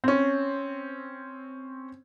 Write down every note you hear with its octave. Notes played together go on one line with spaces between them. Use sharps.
C4 C#4